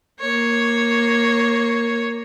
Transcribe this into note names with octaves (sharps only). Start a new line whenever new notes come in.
A#3 C#5